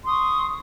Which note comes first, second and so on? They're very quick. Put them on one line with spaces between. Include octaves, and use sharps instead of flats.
C6 D#6 C#6